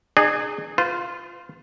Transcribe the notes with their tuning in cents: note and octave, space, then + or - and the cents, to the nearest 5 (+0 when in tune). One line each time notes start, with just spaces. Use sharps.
D#4 -45 G#4 +0 D5 +45
F4 +0 C5 -45